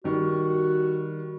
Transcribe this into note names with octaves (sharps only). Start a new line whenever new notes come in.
D#3 G3 F#4